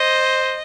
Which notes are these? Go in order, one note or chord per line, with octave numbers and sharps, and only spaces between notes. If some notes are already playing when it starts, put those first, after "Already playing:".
Already playing: C5 D#5